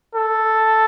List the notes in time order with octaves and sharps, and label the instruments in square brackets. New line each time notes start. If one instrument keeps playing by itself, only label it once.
[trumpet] A4